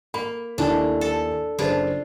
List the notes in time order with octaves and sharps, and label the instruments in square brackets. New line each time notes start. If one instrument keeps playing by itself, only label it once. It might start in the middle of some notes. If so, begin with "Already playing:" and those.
[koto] A#3 [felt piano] B5
[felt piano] D#2 E4 G#5 [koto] A3 D4
[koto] A4
[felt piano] F#1 G#4 C5 [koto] D4 E4 F4